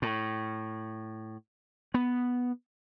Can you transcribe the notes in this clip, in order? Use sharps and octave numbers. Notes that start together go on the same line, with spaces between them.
A2
B3